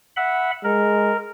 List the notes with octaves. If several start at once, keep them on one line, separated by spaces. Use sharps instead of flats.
E5 F#5 B5
G#3 A#4